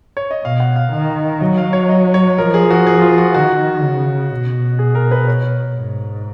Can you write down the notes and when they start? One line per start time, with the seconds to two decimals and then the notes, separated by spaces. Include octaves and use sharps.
0.17 C#5
0.31 D#5
0.44 B2 F5
0.60 F#5
0.76 F5
0.92 D#3 F5
1.41 F#3 D#5
1.58 F5
1.73 C#5
1.89 D#5
2.14 C#5
2.38 F3 A#4
2.54 G#4
2.71 F#4
2.87 G#4
3.02 F4
3.18 F#4
3.34 D#3 F#4
3.82 C#3
4.31 B2
4.79 G#4
4.95 A#4
5.11 B4
5.28 C#5
5.77 G#2